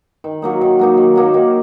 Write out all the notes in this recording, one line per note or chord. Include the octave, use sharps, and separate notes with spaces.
D#3
F#3 A#3 D#4
D#3
F#3 A#3 D#4
D#3
F#3 A#3 D#4
D#3